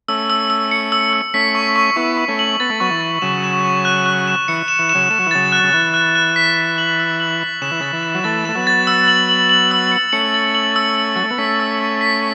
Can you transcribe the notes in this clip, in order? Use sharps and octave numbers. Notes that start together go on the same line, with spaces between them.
A3 C#4 E6
E6
E6
C#7
E6
E6
A3 C#4 B6
C#6
C#6
B3 E4 C#6
C#6
A3 C#4
F#7
B3 A6
A3
F#3 B3 C#6
E3
A6
C#3 F#3 E7
E7
C#6
F#6
F#6
E7
E3 C#7
E7
E3
E7
C#3 F#3
A3 E7
F#3
E3
C#3 F#3 A6
F#6
C#3
E3 F#6
F#6
F#6
B6
B6
F#7
E6
F#7
B6
C#3 E7
E3
C#3 A6
E3
E7
F#3
E3 A3 A6
A3 E7
F#3 B3
A6
E6
F#7
F#7
F#7
E6
C#7
A3 C#4 C#7
A6
F#7
E6
F#7
F#3 A6
A3
B3
A3 C#4 B6
E6
C#6
B6